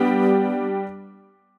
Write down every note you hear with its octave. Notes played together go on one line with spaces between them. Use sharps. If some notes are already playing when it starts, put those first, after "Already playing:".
Already playing: G3 B3 D4 G4